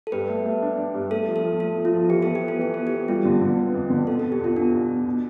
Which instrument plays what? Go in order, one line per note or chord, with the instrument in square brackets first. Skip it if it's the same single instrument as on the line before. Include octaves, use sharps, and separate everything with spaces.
[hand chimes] A4
[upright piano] G2 [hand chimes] B4
[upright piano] A3
A3
D4
D4
G2
[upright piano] A3 [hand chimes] A4
[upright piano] F3
[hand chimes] A4
[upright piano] F3
[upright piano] A3 [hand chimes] A4
[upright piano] F3
[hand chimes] F4
[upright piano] F3
[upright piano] E3 [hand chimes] G4
[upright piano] E3 [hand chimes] A4
[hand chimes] G4
[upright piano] B3
[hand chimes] A4
[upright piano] E3 [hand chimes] G4
[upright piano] B3 [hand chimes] A4
[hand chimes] G4
[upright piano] B3
[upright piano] G3 [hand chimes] F4
[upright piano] D3
D3
B3
F2
D3
[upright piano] B2 [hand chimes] A4
[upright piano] E2 [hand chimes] A4
[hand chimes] G4
[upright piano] E2 [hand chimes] F4
[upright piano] B2 [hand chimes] D4
[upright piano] E2
E2
B2